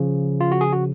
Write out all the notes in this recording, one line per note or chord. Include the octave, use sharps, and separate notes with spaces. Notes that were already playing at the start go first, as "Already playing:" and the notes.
Already playing: C#3 F3
F4
F#4
G#4
F#4